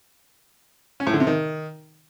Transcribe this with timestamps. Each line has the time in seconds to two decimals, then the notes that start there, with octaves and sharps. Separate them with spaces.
1.00 C#4
1.07 A2
1.13 D3
1.20 C3
1.27 D#3